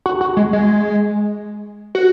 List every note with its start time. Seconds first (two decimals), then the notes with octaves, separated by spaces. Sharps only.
0.06 F#4
0.21 F#4
0.37 G#3
0.53 G#3
1.95 F#4